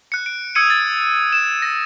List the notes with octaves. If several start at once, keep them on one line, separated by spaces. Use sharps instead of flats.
F#6 C#7
D7
D#6 E6 G#6 C#7 D#7
A6
E7
A#6